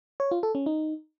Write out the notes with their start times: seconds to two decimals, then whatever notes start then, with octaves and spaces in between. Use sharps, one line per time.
0.20 C#5
0.31 F4
0.43 A4
0.55 C#4
0.66 D#4